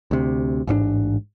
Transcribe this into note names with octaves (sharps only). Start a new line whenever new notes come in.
D2 C3
A1 G#2 C4 D4